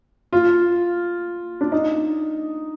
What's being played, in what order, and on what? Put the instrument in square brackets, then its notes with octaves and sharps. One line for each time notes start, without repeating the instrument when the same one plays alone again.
[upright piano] F4
D4
D#4